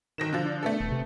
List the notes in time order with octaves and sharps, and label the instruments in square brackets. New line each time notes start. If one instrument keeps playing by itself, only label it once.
[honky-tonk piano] G1 A#6 E7 [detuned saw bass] D#3
[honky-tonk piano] D3 F3
[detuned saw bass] D4
[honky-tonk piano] A3 B3 A4
[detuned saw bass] D#1
C3